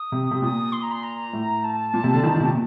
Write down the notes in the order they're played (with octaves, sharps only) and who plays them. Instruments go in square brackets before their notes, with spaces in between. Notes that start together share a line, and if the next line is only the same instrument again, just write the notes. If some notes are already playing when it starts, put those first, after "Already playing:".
Already playing: [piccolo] D#6
[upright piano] C3
C3
[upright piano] A#2 [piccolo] D#6
[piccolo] C6
A#5
C6
A#5
[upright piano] A2
[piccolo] A5
[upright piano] A#2
C3
D3
D#3
D#3
C3
A#2